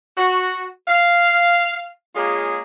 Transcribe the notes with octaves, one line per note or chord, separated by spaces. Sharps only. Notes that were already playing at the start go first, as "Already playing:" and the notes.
F#4
F5
G#3 A#3 C#4 F4 G#4